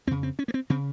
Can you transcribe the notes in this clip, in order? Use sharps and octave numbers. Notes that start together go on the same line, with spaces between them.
F2 C#3 C4
C4
C#4
A#3
C4
C#3 C4